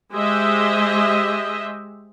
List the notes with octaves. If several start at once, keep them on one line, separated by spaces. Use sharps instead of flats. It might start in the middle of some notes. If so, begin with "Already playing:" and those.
G#3 G4 C5 D#5 E5